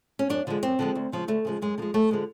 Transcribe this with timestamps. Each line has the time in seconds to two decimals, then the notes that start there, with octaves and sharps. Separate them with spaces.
0.19 C#4
0.29 F#2 D4
0.47 D3 F3 G#3
0.63 F#2 C4
0.79 D3 F3 G#3
0.95 D2
1.12 C#3 F3 G#3
1.28 D2 A3
1.45 C#3 F3 G#3
1.62 F#2 G#3
1.78 D3 F3 G#3
1.94 F#2 A3
2.11 D3 F3 G#3